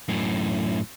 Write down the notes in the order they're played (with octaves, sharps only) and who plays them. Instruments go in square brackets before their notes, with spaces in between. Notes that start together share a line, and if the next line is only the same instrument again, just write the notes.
[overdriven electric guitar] F#2 A2